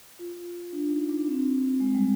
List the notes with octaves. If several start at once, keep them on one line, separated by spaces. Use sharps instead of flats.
F4
D4
D#4
D4
C4
G#3
G3